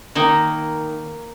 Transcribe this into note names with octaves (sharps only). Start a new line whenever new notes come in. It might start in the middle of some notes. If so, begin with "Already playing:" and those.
D#3 A#3 D#4